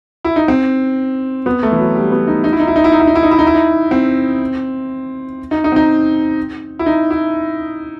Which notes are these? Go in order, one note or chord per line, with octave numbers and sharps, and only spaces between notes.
E4
D#4
C4
B3
A3
E3
F#3
G3
B3
D#4
D#4
E4
D#4
E4
D#4
E4
D#4
E4
D#4
E4
D#4
E4
D#4
E4
D#4
C4
D#4
D#4
C4
D#4
E4
D#4
E4